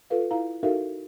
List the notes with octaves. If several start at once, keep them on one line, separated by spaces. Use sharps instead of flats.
F4 A4 B4 F5
E4 F5 A#5
D#4 F#4 A4 A#4 E5 F5